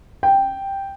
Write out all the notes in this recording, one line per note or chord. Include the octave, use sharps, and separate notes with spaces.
G5